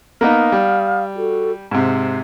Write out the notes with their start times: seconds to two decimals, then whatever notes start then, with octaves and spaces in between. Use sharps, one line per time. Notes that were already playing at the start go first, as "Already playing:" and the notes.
0.21 A#3 B3 D#4 F5 D#6 F6
0.52 G3
1.15 F#4 A4
1.71 G#2 C3 A5